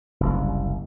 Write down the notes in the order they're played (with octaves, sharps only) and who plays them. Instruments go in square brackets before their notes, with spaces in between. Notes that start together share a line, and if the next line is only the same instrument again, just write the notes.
[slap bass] F#1 C2